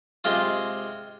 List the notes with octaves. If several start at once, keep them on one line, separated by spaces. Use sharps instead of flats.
C3 G#3 F4